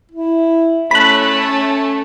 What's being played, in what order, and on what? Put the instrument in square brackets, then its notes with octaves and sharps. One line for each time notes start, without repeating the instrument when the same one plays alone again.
[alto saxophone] E4
[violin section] A3 C#4 A4 [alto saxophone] A5 [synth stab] B5 F#6